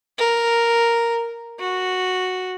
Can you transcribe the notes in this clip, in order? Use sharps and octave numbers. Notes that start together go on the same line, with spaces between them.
A#4
F#4